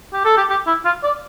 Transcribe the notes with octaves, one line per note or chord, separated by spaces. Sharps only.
G4
A4
G4
G4
E4
F4
D5